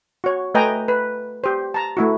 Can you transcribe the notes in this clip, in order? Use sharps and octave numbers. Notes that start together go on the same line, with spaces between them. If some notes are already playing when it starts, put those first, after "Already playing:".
F#4 C#5
A3 B4 D#5 G5 G#5 A#5
B4
G4 C5
A5 A#5
A3 E4 F#4